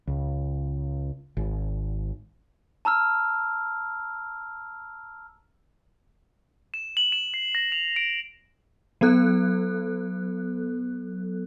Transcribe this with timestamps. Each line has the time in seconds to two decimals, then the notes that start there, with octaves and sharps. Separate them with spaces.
0.07 C#2
1.37 G#1
2.85 A5 A#5 E6 F6
6.74 E7
6.97 F#7
7.12 E7
7.34 C7
7.55 A#6
7.72 F7
7.96 D7
9.01 F#3 B3 A4 F#6